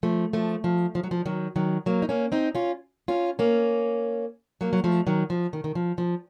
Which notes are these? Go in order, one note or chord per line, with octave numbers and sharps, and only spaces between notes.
F3 A3
F3 A3
F3
F3
F#3
F3
D#3 F#3
D#3 F#3
F#3 A#3
D#4
A#3 C#4
C4 D#4
C#4 F4
C#4 F4
A#3 C#4
F#3 A#3
F#3
F3 A3
D#3 F#3
F3
D#3
D#3
F3
F3